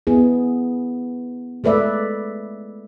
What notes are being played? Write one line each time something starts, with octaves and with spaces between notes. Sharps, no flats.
B3 E4 G#4
G#3 A3 B4 D5 E5